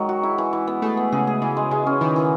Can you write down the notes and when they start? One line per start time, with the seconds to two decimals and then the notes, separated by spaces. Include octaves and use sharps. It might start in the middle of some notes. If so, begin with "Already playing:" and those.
Already playing: D#3 F#3 G#3
0.09 F#4
0.23 E4
0.38 E3
0.53 E3
0.67 B3
0.82 A3 G#4
0.97 B3
1.12 C#3 G#4
1.27 G#4
1.42 C#3 E3
1.57 G#3
1.71 C#3 G#3
1.87 C#4
2.01 D#3 E3
2.16 E3